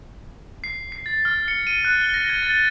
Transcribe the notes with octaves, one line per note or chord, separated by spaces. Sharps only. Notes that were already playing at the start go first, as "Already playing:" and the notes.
C7
C7
A6
F6
C#7
D#7
F#6
G7
A#6
G#6
A6
G7